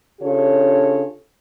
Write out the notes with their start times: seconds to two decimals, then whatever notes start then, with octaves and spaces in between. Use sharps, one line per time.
0.21 C#3 D4 F4 G4 A4 C#5